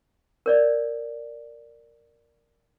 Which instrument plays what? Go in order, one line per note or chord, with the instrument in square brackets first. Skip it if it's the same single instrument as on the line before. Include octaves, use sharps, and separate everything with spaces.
[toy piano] A#4 C#5 D5